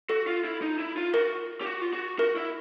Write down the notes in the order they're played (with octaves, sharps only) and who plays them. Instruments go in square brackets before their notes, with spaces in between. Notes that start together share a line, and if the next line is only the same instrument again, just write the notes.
[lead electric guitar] F#4 [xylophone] A4
[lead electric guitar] F4
E4
D#4
E4
F4
[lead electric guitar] F#4 [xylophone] A#4
[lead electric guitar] G4
F#4
F4
F#4
[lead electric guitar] F#4 [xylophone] A#4
[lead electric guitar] E4